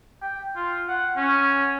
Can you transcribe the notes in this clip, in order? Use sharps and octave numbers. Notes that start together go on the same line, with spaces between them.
G5
F4
F#5
C#4